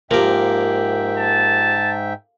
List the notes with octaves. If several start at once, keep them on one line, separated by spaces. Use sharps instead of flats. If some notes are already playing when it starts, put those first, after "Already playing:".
G#2 F3 A#3 G4 E5 G5
A5